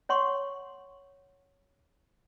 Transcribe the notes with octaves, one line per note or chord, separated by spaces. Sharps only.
C#5 F#5 C6 C#6